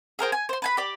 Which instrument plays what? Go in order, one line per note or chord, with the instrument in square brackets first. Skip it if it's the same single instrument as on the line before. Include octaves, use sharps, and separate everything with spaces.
[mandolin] G#4 A#4 C5 G5
G#5
C5 C6
B4 G#5 B5
G4 D5